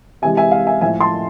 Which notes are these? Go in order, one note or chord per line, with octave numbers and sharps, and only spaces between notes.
C3 E3 G#3 E5 G#5
E5 G#5
F5
E5 G#5
A2 F3 A3 E5 G#5
A5 C6